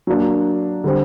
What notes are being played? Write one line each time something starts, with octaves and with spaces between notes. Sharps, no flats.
F#3 A#3 D4
D3 G3 C4